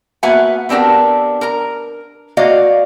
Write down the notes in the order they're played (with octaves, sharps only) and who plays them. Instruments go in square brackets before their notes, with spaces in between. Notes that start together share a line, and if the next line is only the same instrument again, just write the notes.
[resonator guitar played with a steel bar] A#3 B3 F#4 E5 F#5 G#5
B3 C4 D4 G4 A#4
A#4 A#5
A#3 F#4 D5 D#5 F5